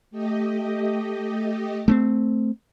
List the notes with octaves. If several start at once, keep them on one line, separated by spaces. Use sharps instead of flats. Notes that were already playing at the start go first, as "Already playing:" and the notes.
A3 G4 D#5
A3 B3 C4